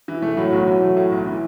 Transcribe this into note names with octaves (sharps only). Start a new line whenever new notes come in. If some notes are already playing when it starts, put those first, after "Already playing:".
E3
A3
A2 F#3
B1
E3
A3
A2
B1
E3